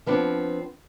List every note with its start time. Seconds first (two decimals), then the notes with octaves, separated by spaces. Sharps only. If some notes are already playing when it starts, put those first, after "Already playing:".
0.06 F3 B3 C4 D4